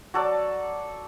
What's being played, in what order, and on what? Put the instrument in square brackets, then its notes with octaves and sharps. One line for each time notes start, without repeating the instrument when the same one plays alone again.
[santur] F#3 A4 D5